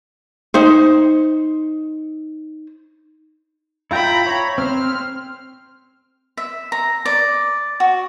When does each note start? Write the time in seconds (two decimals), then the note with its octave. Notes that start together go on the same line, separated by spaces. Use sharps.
0.54 D#4 C5
3.91 E4 F4 G5 A#5 B5
4.26 C#5
4.58 C4 C5 F6
6.37 E5
6.72 A#5
7.05 D5
7.80 F#4